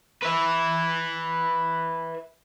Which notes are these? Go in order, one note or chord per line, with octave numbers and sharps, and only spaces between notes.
B4 E5